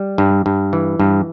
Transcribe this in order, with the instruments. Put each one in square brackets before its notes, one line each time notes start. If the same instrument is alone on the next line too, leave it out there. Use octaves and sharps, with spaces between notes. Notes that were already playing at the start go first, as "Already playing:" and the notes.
Already playing: [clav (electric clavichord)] G3
G2
G2
E3
G2